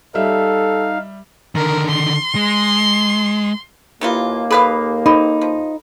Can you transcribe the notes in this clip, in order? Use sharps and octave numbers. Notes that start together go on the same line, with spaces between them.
G3 D#4 A4 E5 F5
D3 D#3 A#4
C6
G#3
D#2 D#3 E3 A#3 F4
G#4 A4 B4 F5 B5
C4 D#4 A4 B5
F3